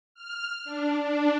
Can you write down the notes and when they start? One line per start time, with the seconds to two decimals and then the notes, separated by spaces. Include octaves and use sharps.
0.14 F6
0.65 D4
1.03 D4